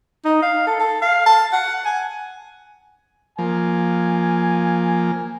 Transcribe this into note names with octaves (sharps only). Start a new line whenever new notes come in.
D#4
F5
A4
A4
F5
A5
F#5
G#5
F3 A#3 G#5